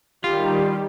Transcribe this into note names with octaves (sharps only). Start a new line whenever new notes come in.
D#3 G3 F4 G4